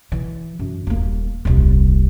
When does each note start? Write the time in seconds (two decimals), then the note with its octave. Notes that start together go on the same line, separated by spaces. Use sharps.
0.12 E3
0.59 F#2
0.87 D#1 A#3
1.45 D#1 C2